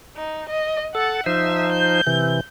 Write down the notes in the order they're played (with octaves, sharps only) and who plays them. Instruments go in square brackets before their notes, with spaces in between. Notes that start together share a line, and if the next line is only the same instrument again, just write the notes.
[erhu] D#4
D#5
[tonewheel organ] A4 [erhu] F#5
[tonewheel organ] F3 D#4 C5 [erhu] E5
[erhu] G6
[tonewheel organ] C3 E3